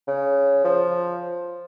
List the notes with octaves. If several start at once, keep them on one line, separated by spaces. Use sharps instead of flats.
C#3
F3